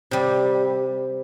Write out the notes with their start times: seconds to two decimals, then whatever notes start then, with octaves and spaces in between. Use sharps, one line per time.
0.11 C3 G3